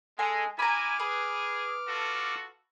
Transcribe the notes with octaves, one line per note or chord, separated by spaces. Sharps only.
G#3 A4 G#5
E4 G#5 A#5 B5 D6 F6
G#4 B4
F4 F#4 A4